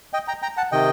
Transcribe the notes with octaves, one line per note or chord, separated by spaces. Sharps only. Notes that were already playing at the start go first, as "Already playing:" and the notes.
D#5 G5
G5 A#5
G5 A#5
F#5 A5
C3 D#3 D#5 G5